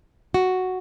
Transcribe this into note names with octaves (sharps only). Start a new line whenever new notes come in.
F#4